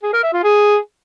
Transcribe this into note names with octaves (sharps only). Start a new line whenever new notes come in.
G#4
A#4
E5
F4
G#4